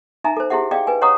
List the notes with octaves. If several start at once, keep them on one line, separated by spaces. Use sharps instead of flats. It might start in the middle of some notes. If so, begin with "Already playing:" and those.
D#4 E5 G#5 A#5
A4 C5
E4 G4 G#4 E5 F#5
G#4 D5 D#5 F5 G5
B4 G#5
C#5 D#5 F#5 A#5 C#6 D#6